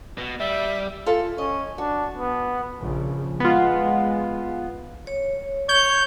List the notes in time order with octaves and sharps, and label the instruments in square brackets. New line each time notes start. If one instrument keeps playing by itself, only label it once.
[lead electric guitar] B2
[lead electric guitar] G3 [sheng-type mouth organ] E5
[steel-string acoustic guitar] F4 G#4 A4
[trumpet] C#4 [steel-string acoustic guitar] D#5
[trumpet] D4 [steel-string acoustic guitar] F#4
[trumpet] B3
[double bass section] A#1 C#3
[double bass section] G#3 [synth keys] B3 F4
[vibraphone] C#5
[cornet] C#5 [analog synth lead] G6